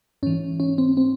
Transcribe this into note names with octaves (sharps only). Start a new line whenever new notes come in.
G#2 E3 C#4
C#4
C4
C4